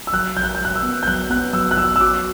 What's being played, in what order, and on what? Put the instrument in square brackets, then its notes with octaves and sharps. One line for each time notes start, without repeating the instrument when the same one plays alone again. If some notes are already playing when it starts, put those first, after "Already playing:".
[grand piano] E6
[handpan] F#3 [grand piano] F#6
[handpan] F#3 [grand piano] G6
[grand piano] F#6
G6
[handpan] F#3 [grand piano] F#6
[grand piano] E6
[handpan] B3
[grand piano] G6
[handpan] F#3 [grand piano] F#6
[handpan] B3 [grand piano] F#6
[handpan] F#3 [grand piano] E6
[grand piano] F#6
[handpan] F#3 [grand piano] E6
[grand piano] E6
[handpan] F#4 [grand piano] D6